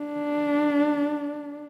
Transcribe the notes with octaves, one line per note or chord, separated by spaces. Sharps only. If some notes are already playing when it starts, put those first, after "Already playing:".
Already playing: D4